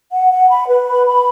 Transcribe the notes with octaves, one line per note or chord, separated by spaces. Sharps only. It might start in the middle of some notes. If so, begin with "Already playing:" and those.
F#5
F#5
B5
B4
B5
B5